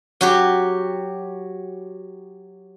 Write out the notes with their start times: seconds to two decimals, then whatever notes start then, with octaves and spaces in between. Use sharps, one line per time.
0.21 F#3 F#4 G4